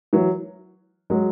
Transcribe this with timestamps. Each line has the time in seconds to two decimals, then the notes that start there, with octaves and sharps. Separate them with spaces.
0.13 E3 F#3
1.10 F#3 G#3